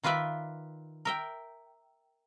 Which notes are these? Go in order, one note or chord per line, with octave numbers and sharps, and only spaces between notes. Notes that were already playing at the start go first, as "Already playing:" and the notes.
D#3 F4 B4 D5 E5
A#4 E5 G5